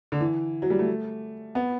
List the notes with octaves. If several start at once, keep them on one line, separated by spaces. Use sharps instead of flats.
D3
E3
F#3
G3
A3
B3